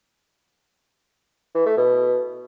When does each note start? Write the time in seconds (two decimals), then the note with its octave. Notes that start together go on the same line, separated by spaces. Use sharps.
1.55 E3
1.66 A3
1.77 B2